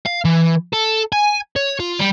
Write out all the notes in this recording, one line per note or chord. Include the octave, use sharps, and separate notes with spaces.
F5
E3
A4
G#5
C#5
F4
G3